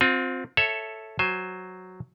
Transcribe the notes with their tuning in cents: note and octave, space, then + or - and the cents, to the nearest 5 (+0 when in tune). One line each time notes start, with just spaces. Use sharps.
C4 +0 F4 +35
A4 +0 C#5 +0 E5 +0
F#3 +0 C5 +5 G#5 -10